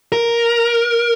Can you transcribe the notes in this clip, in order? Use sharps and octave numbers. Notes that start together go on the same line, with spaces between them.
A#4